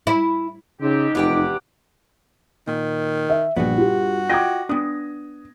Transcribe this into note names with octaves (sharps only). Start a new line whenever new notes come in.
E4
C#3 G#3 C4 D#4 G4
F1 E2 G4 F#5 G5 D6
A#2 D#3
E5
A#1 G2 B3 F#4
F4 G4
F4 D#5 G5 D6 G#6 A#6
B3 D4 D#6